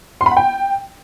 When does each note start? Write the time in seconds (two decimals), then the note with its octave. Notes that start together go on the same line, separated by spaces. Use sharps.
0.21 C6
0.26 B5
0.31 F#5
0.37 G5